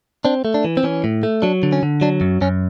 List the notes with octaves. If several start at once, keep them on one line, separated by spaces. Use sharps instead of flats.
C4 D4
A3
D4
E3
C4
E3 C#4
A2
A3
F#3 D4
D3
C#4
D3
F#3 D4
F#2
F#2 C#4